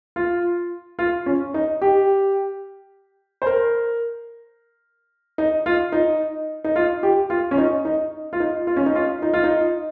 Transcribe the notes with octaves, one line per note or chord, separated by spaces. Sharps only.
F4
F4
C#4
D#4
G4
C5
A#4
D#4
F4
D#4
D#4
F4
G4
F4
C#4
D#4
D#4
F4
D#4
F4
C#4
D#4
F4
D#4
F4
D#4